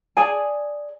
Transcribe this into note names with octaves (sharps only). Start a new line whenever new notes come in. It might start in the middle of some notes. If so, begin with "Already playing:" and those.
G#4 D5 G#5 A5